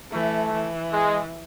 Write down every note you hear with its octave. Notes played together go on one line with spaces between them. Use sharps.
E3 A3
E3
G#3